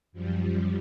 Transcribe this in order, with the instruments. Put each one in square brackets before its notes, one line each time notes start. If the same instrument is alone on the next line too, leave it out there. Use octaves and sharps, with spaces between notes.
[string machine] F#2 F3 G3